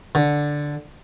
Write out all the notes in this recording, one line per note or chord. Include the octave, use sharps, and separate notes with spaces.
D3